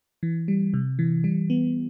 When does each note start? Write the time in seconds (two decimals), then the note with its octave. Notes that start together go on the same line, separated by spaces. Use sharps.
0.23 E3
0.48 G3
0.74 C3
0.99 E3
1.24 G3
1.50 B3